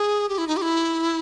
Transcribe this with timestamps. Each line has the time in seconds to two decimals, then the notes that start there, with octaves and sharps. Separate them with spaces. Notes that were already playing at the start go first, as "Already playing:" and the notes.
Already playing: G#4
0.29 G4
0.38 E4
0.47 D#4
0.57 G4
0.62 E4